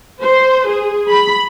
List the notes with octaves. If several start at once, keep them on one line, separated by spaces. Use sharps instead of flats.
C5
G#4
B5